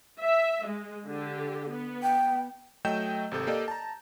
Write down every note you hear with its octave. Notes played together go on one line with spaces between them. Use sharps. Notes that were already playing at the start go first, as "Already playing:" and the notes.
E5
G#3
D3 G4
B3
G5
F#3 A3 D#5 G5 G6 E7
G#1 C3 A4 G6
A#3 G4 A4 D5 D#5
A5 A#5